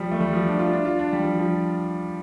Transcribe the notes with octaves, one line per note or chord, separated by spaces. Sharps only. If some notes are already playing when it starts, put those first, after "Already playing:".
Already playing: F3 G3
A3
G3
F3
D4
F4
D4
F4
D4
G3
F3
F3